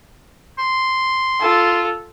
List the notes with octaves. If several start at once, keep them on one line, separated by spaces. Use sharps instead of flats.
C6
F4 A4